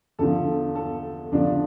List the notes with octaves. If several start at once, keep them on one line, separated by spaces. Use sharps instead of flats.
E2 D3 F3 A4
A4
E2 D3 F3 D4